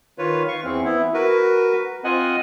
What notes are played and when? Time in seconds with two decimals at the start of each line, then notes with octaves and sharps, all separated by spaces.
0.18 D#3 F4 B4 C#5
0.48 F5 C#6
0.64 E2 E3 C4
0.85 B3 E4
1.14 F#4 A#4 B4
2.04 C4 F4 D#5 F#5 G#5